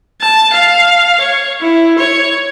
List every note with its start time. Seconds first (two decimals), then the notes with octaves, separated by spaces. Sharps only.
0.21 A5
0.53 F5
1.20 C#5
1.61 E4
1.98 C#5